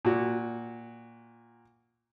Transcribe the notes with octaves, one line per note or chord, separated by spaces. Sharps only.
A#2 F#4